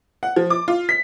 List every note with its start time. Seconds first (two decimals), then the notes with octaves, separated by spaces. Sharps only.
0.23 F#5
0.36 F3
0.50 D6
0.68 F4
0.89 B6